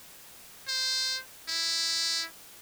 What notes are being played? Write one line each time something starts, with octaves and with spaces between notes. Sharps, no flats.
C5
E4